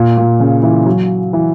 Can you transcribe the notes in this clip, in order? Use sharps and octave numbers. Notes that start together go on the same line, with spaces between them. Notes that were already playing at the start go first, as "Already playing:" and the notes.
Already playing: A#2
A#2
C#3
E3
F#3
E3